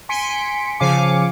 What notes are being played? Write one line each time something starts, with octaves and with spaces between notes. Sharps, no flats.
G#5 C6 B6 C#7 D7
C#3 F3 F5 G#5 D6 C#7